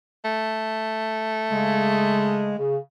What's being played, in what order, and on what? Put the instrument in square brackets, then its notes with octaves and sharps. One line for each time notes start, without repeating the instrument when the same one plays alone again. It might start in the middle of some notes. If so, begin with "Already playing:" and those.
[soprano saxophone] A3
[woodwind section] C#3 G#3
C#3